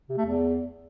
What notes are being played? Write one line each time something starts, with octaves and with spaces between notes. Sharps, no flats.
C3
A3
E2